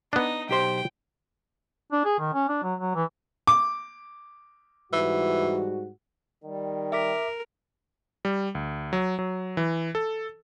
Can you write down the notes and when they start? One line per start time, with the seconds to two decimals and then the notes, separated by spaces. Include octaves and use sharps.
0.13 B3 D4 D#4 D#5
0.49 B1 G4 C5 G5
1.92 D4
2.05 G#4
2.19 D#3
2.33 C#4
2.48 D4
2.63 F#3
2.79 F#3
2.95 E3
3.47 D6
4.93 G#2 E3 G3 F#4
6.44 D#3 G3
6.92 A#4 E5 D6 B6
8.25 G3
8.55 D2
8.93 F#3
9.19 F#3
9.57 E3
9.95 A4